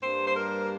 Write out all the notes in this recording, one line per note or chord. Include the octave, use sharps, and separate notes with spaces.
G2 G3 A#3 C5
C5
A#4